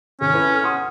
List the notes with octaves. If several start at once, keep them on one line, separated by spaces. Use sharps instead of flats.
G#1 C#4
E4 A4 B4
F6
F#5 C6 D#6